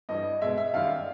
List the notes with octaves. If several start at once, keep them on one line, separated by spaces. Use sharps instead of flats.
G2 E3 G3 D#5
B2 G#3 E5
E5
F#2 D#3 G3 F5